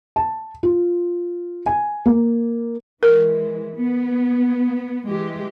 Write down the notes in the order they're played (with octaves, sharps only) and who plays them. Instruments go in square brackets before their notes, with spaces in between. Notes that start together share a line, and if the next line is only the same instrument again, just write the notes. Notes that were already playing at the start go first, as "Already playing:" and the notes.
[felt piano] A5
F4
G#5
A#3
[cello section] E3 G#3 [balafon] A#4
[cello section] B3
E3 G#3 G4